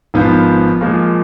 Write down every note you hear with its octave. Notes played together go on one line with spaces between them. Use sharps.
G#1 G#2 F3 B3 F4
A#2 F3 G#3